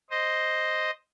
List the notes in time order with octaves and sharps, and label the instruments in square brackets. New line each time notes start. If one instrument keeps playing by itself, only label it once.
[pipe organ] C5 D#5